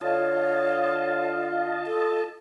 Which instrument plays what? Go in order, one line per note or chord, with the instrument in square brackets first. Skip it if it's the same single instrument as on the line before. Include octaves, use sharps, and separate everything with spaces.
[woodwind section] D3 F5 [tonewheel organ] F4 D#5 A5 [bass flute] C#5
[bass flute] A4